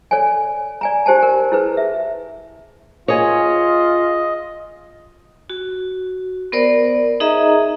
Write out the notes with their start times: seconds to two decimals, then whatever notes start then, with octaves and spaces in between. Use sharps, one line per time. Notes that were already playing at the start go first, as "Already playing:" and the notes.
0.11 A4 C#5 D5 G#5
0.81 D5 G#5 A#5
1.06 D#4 G4 C5 G#5 A5
1.23 A#4
1.52 E4 G#4 B4
1.77 E5
3.08 F4 G#4 C#5 D#5
5.50 F#4
6.52 B3 A#4 C5 D5
7.20 D#4 G#4 D#5 E5 A#5